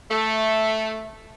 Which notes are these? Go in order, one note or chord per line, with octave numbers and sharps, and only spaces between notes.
A3